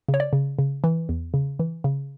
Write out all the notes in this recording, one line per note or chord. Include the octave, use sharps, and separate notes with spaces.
C#3
C#5
D5
C#3
C#3
E3
E2
C#3
E3
C#3